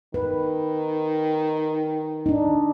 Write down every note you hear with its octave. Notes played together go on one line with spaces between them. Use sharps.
D#3 B4
D4 D#4